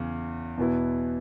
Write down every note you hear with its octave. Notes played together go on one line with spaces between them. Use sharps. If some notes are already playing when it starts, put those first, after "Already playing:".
Already playing: E2 C#3
E2 B2 B3 E4